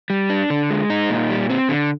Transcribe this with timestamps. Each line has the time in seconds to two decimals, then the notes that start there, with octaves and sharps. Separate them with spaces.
0.10 G3
0.30 D4
0.50 D3
0.71 G#3
0.90 D#4
1.10 A#2
1.30 G3
1.50 C4
1.69 D3